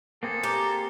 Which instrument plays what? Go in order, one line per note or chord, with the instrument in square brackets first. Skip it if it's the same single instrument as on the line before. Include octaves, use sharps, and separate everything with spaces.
[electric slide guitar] A#3 C4 G#4 [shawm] A4
[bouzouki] G4 [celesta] A#5 D6